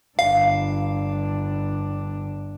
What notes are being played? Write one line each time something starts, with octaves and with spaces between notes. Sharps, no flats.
G1 D4 F5